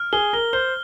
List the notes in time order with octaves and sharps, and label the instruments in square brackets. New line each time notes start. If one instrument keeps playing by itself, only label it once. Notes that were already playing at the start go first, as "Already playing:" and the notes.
Already playing: [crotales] F6
[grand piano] G#4 [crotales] G7
[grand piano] A#4 [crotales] G7
[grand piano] C5 [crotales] G7